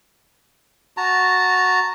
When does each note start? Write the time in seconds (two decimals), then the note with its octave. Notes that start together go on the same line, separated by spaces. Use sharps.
0.97 F#4 A5 A#5